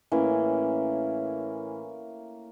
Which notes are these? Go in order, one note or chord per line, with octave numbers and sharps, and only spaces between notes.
A2 E3 A#3 C#4